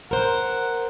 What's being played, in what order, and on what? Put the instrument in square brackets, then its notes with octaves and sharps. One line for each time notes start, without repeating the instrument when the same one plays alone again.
[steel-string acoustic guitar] A#4 C5 [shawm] F#5